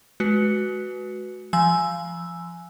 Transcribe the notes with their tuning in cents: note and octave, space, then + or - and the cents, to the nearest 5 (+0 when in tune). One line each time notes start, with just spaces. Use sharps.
G#3 +30 F#4 +0 B4 +0
F3 -15 G#5 +10 E6 +0